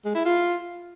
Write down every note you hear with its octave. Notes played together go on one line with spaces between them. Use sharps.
G#3
E4
F4